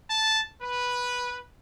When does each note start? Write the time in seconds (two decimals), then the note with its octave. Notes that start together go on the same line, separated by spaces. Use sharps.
0.10 A5
0.62 B4